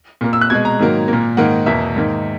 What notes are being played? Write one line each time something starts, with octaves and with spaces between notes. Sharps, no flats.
A#2 A#3
E6
F#6
B2 G#3 G#6
A#5
G#2 D#3 F#3 A#3
A#2 A#3
G#2 D#3 A#3 F#5
E2 B2 A#3 E5
G#2 D#3 A#3